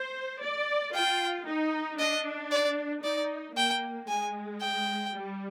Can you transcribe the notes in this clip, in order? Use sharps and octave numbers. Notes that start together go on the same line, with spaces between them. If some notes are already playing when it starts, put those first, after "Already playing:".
Already playing: C5
D5
F4 G5
D#4
D4 D#5
D5
D#4 D5
A#3 G5
G#3 G#5
G5
G3